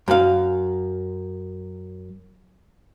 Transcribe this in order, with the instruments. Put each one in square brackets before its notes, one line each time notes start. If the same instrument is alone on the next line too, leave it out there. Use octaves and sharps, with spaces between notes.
[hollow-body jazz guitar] F#2 F5